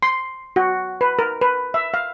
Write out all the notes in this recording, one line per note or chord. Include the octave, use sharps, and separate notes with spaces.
C6
F#4
B4
A#4
B4
E5
F5